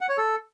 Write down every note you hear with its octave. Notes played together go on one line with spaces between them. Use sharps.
F#5
C#5
A4